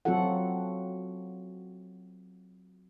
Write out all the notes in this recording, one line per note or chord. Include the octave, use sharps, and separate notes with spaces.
F#3 C4 F4 F#4 A4 F#5